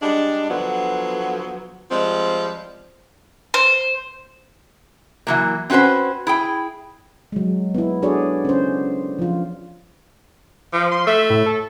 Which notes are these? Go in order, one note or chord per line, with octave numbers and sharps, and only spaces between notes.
G3 G#3 D4
D3 F3 F#3 B3
F3 G3 G#3 C4
C5
E3 F#3 A#3
C4 C#4 F#4 B4 C5
E4 G#4 G5
F#3 G#3
B3 E4
D4 F#4 G#4 A4 C#5 D5
C#4 C5
F3 F4
F3
C6
A3 E5
A2
A4